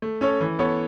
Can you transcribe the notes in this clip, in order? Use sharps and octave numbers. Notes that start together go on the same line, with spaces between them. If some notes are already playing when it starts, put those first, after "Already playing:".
A3
C#4 A4 C#5
E3
B3 A4 C#5